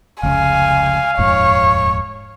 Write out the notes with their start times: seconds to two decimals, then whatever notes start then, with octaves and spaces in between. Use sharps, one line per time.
0.23 F1 C#2 C#3 F5 G#5
1.19 D#1 F2 G#2 C#5